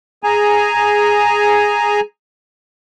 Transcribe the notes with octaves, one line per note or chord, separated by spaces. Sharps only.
G#4 G#5 A#5